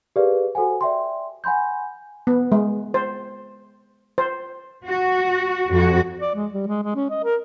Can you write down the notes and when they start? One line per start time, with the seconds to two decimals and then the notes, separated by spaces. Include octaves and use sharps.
0.16 G4 G#4 A#4 B4 D5 F5
0.55 F#4 A4 C5 F#5 G#5
0.81 D5 E5 G5 C6
1.44 F#5 G#5 B5 C6 G6
2.27 B3
2.52 G#3
2.94 C5
4.18 C5
4.85 F#4
5.71 F2 F#4
6.21 D5
6.35 G#3
6.53 G3
6.67 G#3
6.83 G#3
6.95 C#4
7.10 D#5
7.24 A#4